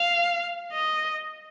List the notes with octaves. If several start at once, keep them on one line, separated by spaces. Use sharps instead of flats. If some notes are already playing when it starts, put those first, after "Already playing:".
Already playing: F5
D#5